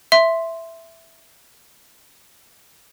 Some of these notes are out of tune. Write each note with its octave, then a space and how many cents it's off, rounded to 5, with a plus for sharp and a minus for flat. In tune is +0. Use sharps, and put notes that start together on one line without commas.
E5 +5 C6 +0